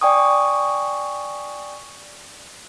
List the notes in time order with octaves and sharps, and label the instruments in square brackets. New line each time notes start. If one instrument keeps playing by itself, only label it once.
[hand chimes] D5 G5 G#5 C#6 D#6